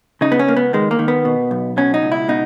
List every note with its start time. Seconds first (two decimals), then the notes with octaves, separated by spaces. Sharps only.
0.21 C#3 D#4
0.32 B3
0.39 C#4
0.48 C#2 A#3
0.57 B3
0.73 D#3 G#3
0.91 A#3
0.99 D#3
1.08 B3
1.25 B2
1.51 B1
1.77 B2 C#4
1.94 D#4
2.02 C#2
2.12 E4
2.28 B2 D#4